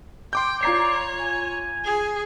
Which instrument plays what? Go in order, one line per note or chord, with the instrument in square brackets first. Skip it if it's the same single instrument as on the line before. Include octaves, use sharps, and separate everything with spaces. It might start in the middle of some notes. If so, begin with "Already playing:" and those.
[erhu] G5 [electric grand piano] C6 D6 G6
[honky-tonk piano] F4 A#5 C7 [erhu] C#5 [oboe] D5
[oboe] G#5
[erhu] G#4